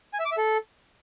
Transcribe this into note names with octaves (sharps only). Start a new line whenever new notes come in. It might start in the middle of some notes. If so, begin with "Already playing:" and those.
G#5
E5
D6
E5
A4